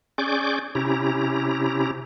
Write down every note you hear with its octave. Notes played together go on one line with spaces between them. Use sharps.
C#4 G#4 D5 C#6 D6 G6
C3 C#4 E4 G4 A#5